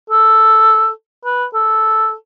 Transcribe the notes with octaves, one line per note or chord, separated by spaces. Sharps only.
A4
B4
A4